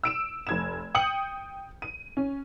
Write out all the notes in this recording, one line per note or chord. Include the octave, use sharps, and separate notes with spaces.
E6 D7 E7
F1 G#6 E7
G5 D#6 G6 C#7 F#7
D#7
C#4